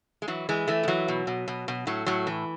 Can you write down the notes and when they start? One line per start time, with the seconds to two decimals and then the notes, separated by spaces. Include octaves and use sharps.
0.22 G#3
0.28 E3 F#3
0.49 E3 G#3
0.68 E3 A3
0.83 G#3
0.88 E3 F#3
1.08 B2
1.27 B2
1.48 B2
1.68 B2
1.87 A2 F#3
2.06 A2 F#3
2.27 E3